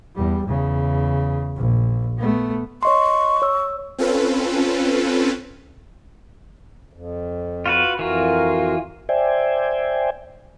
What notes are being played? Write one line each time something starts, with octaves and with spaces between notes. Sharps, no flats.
E2 G3
E2 C#3
A#1
A3 B3
C#5 D#5 C6 C#6
C#5 E6
C4 C#4 F4 A4 B4
F2
F4 F#4 B4
F2 E3 F4 F#4 A#4
C5 D5 E5 G5 G#5